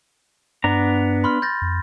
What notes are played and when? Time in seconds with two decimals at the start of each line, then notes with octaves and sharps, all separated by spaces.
0.64 G2 B3 D4 A#5
1.24 B5 C6 F6
1.42 G6 A6 A#6
1.62 F2